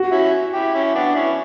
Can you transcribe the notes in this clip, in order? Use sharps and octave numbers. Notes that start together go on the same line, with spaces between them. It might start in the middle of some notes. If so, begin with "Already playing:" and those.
Already playing: F#4
C#4 E4
E4 G4
C#4 E4
B3 D4
C#4 E4